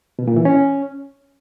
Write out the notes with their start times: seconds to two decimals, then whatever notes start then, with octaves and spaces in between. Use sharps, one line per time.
0.19 B2
0.28 A#2
0.36 E3
0.45 C#4